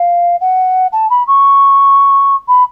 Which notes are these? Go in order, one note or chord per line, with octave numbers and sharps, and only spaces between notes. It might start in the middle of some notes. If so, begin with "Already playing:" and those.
Already playing: F5
F#5
A5
B5
C#6
B5